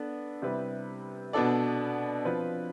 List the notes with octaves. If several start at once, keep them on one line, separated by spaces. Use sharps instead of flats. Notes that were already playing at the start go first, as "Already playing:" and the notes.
Already playing: B3 D4 A4
C3 G3 C4 E4 B4
B2 B3 D4 A4 D5
F3 C4 F4 B4